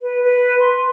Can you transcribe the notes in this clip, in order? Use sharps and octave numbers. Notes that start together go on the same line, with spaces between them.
B4
B4
C6